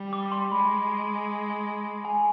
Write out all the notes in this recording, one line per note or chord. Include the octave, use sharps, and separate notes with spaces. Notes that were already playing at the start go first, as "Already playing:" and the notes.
Already playing: G3
D6
C6
G#3 B5
G#5